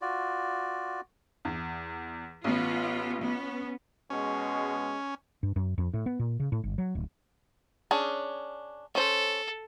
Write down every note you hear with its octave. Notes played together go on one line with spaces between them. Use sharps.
F4 F#4 D5
E2
A1 B3 F4
B3 C#4
B2 G#3 C#4
G2
F#2
F2
A2
B3
A#2
C#3
A2
G1
F#3
D1
C#4 D4 G#4
C#4 A4 C5